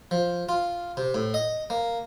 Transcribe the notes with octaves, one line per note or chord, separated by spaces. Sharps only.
F3
F4
C3
A2
D#5
A#3